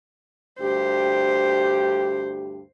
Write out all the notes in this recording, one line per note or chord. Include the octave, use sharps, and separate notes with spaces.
D2 G2 G4 C5